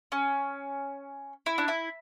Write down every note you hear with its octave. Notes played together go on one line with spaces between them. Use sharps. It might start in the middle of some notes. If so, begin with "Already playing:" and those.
C#4
E4
D4
E4